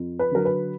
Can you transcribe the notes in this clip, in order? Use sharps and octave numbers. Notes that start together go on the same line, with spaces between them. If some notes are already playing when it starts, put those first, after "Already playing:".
Already playing: F2
B4
D3 F#3 A#4
B4